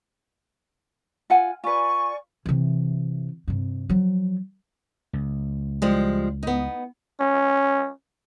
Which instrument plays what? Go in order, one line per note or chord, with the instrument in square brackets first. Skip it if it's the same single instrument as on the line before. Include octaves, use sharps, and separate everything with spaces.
[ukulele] F4 F#5 G#5
[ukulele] F4 B4 [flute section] D5 G#5 C#6
[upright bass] C3 E3
G2 C3
F3 F#3
[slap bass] C#2
[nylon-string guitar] F3 G3 G#3
B3 D#4
[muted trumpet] C#4